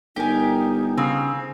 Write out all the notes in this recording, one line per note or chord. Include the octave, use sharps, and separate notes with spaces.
G1 D#4 G4 A#4 G#5
C#3 C4 G#4 F5